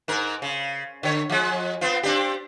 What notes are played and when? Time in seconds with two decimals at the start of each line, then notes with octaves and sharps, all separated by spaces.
0.08 G#2 A#4
0.42 C#3
1.03 D3 C#5
1.30 F3 G#3
1.81 B3 C4 F4
2.03 C4 D4 G4